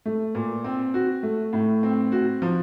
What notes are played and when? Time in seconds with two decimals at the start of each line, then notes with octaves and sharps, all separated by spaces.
0.06 A3
0.35 A#2
0.64 C4
0.94 F#4
1.23 A3
1.53 A2
1.83 C4
2.12 F#4
2.42 F3